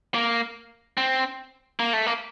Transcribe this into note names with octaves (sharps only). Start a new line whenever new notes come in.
A#3
C4
A#3
A3
A#3